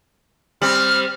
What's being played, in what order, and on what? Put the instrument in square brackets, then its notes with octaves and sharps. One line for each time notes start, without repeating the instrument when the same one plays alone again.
[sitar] G3 C4 [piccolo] F6